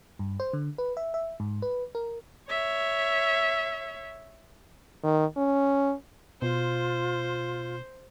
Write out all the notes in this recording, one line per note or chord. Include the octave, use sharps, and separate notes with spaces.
G2
C5
D3
B4
E5
E5
G#2
B4
A#4
C#5 E5
D#3
C#4
B2 F4 C5